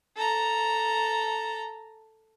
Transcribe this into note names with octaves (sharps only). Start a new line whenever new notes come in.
A4 A#5